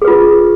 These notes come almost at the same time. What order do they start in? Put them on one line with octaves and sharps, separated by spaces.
G#4 B4 F4